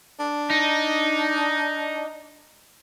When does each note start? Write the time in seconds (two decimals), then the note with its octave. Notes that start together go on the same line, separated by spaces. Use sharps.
0.19 D4
0.50 D#4